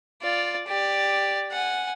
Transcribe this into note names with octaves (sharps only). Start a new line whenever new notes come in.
F4 D5
G4 D5
F#5 G#5